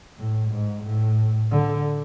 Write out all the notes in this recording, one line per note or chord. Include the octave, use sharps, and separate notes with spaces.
A2
G#2
A2
D3